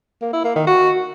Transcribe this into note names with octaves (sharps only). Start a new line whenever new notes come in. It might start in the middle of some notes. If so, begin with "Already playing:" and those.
A#3
E4
A#3
D#3
F#4